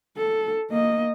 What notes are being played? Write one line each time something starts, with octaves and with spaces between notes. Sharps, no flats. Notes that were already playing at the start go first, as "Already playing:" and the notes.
A4
A#3 D#5